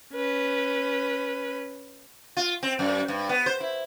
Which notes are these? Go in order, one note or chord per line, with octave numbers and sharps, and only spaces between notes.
C#4 B4
F4
C4
F#2
G2
B3
C5
E4